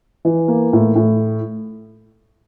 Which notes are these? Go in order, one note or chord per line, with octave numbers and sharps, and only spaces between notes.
E3
A#3
A2
A2